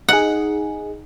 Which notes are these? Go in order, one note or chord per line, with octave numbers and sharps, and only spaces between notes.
D#4 G#4 F#5